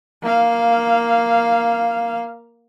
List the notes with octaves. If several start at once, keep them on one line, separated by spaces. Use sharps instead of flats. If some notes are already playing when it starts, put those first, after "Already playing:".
A#3 F5